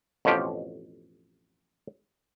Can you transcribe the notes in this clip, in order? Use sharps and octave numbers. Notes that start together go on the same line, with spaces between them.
A1 F2 B2 F3 G4